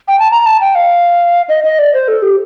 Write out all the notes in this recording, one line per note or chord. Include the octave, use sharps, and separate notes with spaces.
G5
A5
A#5
A5
G5
F5
D#5
D#5
D5
C5
A4
G4